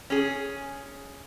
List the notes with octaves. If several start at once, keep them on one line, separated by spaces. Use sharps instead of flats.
C#4 G#4